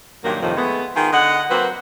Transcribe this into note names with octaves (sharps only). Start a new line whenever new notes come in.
G2 A#2 D#3 F#3 A#3
F2 A2 C3 D#3 F3
G#3 A3 B3
D#3 B3 F4 G#4
D3 D#5 F#5
F#3 A#3 C4 F#4 B4